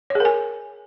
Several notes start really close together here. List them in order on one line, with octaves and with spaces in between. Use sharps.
C#5 G#4 A#4 G#5